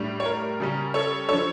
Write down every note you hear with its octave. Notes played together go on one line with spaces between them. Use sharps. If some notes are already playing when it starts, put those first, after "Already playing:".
Already playing: A2 G3 D4
C#5
A#4
C#3 G3 C#4
A4 C#5
D3 F3 A4 C#5